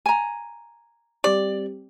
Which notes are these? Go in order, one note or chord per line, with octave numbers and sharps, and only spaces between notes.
G#5 A#5
G3 C4 G4 D5